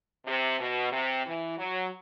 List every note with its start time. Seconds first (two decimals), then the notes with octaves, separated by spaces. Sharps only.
0.26 C3
0.59 B2
0.92 C3
1.26 E3
1.58 F#3